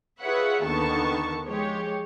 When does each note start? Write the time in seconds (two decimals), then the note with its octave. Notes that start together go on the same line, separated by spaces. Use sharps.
0.20 F4 G#4 B4 C#5 E5 F#5
0.63 D#2 D3 D#3 B3 A5 C#6
1.46 F3 G#3 G4 C#5